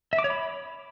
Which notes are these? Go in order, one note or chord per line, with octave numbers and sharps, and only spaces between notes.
E5
D6
C#5
B5